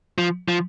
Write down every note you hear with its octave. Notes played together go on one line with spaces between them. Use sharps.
F3
F3